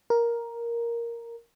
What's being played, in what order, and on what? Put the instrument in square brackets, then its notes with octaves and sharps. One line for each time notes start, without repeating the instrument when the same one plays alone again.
[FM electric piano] A#4